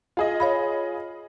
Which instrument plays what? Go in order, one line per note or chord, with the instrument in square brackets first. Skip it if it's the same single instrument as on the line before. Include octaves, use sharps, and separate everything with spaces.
[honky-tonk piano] F4 G#4 D#5
[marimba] C#5 F5 B5